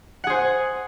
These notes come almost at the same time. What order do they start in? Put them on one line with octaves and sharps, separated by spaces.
F#5 G#4 C5 G#5